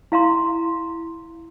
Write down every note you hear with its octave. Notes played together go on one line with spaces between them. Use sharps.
E4 F5 A#5 C6